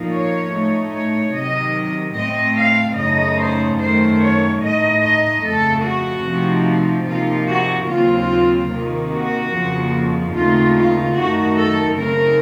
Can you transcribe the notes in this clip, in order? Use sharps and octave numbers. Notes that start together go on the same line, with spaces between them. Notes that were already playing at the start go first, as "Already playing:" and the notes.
Already playing: A#2 F3 A#3 D#4
C#5
A2 A3 D#4
C#5
C3 D#3 F#3 D#5
A2 A3 C4 D#5
F5
F#2 C#3 A3 D#4 D#5
C5
F#2 D#3 A3 C5
C#5
A2 A3 D#4 D#5
D#5
F2 C#3 A3 A4
F#4
C3 F3 A3 C4 D#4
C3 F3 A#3 D#4 F4
F#4
D#2 C#3 F#3 C4 F4
C3 D#3 A#3
F#4
F2 C#3 F3 A#3
D#2 C#3 A3 C4 D#4 F4
F4
F#2 D#3 A3 D#4 F#4
A4
C#3 A3 C4 D#4 A#4